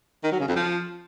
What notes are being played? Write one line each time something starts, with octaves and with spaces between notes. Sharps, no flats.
D#3
F#3
C#3
F2
F3